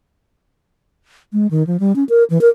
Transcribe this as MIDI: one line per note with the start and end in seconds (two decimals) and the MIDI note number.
1.33 1.47 56
1.51 1.65 51
1.67 1.77 53
1.80 1.95 55
1.96 2.04 61
2.09 2.24 70
2.30 2.40 52
2.41 2.49 70